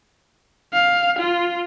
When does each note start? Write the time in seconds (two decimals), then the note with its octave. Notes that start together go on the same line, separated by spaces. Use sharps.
0.74 F5
1.19 F4